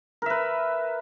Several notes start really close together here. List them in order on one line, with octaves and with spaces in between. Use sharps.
A#4 E5 B4